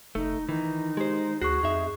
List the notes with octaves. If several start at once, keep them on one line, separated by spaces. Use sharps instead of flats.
F1 A3 D#4
D#3 E3 D#4
G#3 G4 C5
D2 F#4 G#4 C#6 F#6 C7
F2 D#4 E5